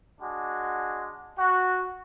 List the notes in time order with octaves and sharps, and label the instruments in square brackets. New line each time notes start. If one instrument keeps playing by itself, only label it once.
[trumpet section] G#3 D4 F#4
F#4